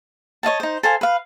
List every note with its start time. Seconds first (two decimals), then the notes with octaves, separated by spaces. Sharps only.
0.43 C#5 D#5 F5 A5
0.60 D#4 C5
0.83 A4 C5 F5 G#5
1.01 B4 F5